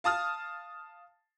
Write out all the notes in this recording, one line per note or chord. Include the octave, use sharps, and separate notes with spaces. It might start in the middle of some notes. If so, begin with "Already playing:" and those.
F5 A5 D#6 F6